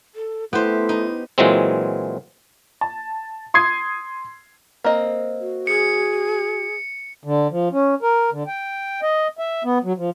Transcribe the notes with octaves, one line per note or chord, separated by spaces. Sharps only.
A4
A3 B3 E4 G4 C5
D#4
A#2 E3 F#3 G#3 C4
A5
C6 D#6 G#6 C7
A#3 C4 D#5
F#4
G#4 C#7
D3
F3
C#4
A#4
D3
G5
D#5
E5
B3
F#3
F3